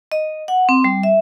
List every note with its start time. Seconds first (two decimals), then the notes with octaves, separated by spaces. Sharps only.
0.12 D#5
0.48 F#5
0.69 C4
0.84 G3
1.03 E5